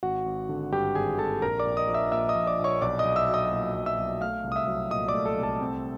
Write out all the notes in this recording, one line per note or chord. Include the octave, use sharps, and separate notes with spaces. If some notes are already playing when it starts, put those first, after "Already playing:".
G#1 F#4 F#5
G#1
D3
G2 G4 G5
G#1 G#4 G#5
G#1 A4 A5
A#1 A#4 A#5
D5 D6
A#1
D#5 D#6
F3
E5 E6
A#2 E5 E6
D#5 D#6
A#1
D5 D6
A#1
C#5 C#6
B1 D5 D6
D#5 D#6
B1
E5 E6
F#3
D#5 D#6
A#2
B1
E5 E6
B1
A3 F5 F6
C2
D#6
E5 E6
F#3
A#2 D#5 D#6
D5 D6
A3
A4 A5
C2
A4 A5
C4